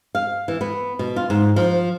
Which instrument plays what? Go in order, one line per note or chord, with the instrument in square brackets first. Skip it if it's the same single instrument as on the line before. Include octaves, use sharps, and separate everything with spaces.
[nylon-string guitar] F5
E3
B3
B2
F4
G#2
F3